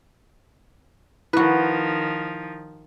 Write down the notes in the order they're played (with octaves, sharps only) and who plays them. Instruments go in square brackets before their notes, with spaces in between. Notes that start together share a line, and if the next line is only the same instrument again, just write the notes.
[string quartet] D#3 F3 [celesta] E4 [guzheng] F#4 B4